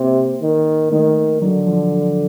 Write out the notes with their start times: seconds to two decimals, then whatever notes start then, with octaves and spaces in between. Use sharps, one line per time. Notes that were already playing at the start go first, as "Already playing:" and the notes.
Already playing: C3 A#3
0.42 D#3
0.92 D#3 A3
1.42 D3 F#3
1.67 F3